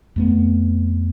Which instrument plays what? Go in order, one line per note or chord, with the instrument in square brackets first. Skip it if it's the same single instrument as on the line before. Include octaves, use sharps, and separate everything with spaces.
[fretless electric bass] F2 A3 B3